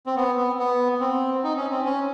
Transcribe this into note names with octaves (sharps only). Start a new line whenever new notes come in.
C4
B3
B3
B3
C4
D#4
C#4
C4
C#4